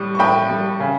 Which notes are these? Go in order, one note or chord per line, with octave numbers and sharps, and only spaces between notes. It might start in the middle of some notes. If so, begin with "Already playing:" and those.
Already playing: A2 G3
C#6
A2 G5 B5
G3
C#3